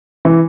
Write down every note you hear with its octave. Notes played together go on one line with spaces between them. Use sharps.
E3